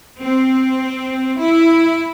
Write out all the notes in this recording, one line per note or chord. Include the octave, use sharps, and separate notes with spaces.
C4
E4